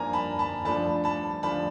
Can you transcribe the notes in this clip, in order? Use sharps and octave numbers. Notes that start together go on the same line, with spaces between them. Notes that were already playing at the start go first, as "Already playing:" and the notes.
Already playing: F3 A#3 D4 G#5 A#5
A5 B5
A5 B5
F3 A3 D4 A5 B5
A5 B5
F3 A3 D4 A5 B5